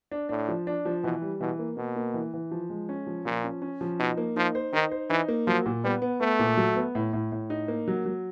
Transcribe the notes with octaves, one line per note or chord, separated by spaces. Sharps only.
D4
A2 D4
F3
D4
F3
B2 E3
G3
B2 E3
A#3
B2 A#3
A#3
E3
E3
F3
G#3
C#4
F3
A#2 F3
C#4
C#4
F3
B2 D#4
A#3
F3 D#4
C5
D#3 D#4
C5
E3 D#4
A#3
F3 F#3
A#2
G3 B3
B3
A3 B3
A#2
F#3
B3
A2
A2
A2
D#4
A#3
F#3
F#3